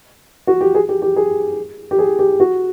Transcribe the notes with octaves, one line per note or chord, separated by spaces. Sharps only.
F#4
G4
G#4
G4
G4
G#4
G4
G#4
G4
F#4